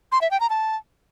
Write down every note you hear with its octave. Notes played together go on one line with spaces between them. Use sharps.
C6
E5
G5
A#5
A5